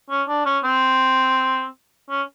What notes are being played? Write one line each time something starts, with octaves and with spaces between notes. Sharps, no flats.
C#4
D4
C#4
C4
C#4